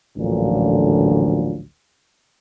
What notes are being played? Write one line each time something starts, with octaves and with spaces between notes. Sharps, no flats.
A1 D2 A#2 D3 F3 F#3